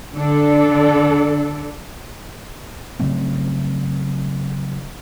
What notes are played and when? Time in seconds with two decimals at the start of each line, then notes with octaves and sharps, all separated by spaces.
0.14 D3 D4 A4
3.00 C#3 F#3 A3 C4